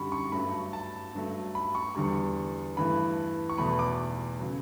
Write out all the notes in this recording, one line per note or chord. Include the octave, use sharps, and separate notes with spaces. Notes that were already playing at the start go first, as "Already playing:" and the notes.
Already playing: F#2 D3 G3 B5 C#6
C#6
G2 F#3 A3 B5
A5
G2 F#3 A3
B5
C#6
E2 D3 G3 C#6
G2 E3 A3 B5
C#6
E2 B2 A3 B5
D6
C#3 F#3